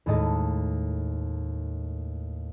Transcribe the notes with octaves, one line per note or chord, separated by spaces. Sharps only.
D#2 A2 G#3 A4 D#5 A5